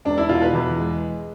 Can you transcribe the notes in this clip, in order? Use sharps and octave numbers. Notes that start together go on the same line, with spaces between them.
E1 D4
E4
B2 F4
B4
E2
G#3